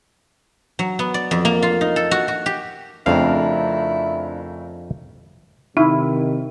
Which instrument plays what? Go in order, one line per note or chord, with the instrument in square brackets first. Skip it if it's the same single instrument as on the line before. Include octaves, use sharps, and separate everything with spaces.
[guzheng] F#3
B3
D5
F2
A#3
F4
D#4
A4
F#4
F#4
G4
[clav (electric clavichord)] F2 F5 [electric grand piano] C#3 A3 C4 [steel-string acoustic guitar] D4 A#4 [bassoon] E4
[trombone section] C3 D#3 [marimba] D#4 [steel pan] E4